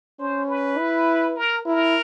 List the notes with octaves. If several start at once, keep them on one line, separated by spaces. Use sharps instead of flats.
C#4 C5
B4
E4
A#4
E4 A#4